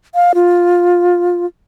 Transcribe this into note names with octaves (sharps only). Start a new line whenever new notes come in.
F5
F4